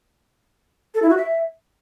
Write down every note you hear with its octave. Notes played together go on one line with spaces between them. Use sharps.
A4
E4
F#4
E5